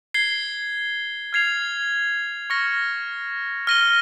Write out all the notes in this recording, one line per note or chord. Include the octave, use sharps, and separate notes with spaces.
G#6 C7 G7
F6 G#6 C7 F7
C#6 F6 A#6 C#7
F6 A#6 D#7 G7